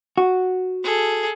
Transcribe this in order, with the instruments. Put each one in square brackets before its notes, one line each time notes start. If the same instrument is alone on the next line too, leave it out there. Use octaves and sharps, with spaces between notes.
[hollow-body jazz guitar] F#4
[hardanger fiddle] G#4 A4